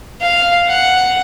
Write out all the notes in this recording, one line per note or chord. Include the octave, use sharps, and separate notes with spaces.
F5
F#5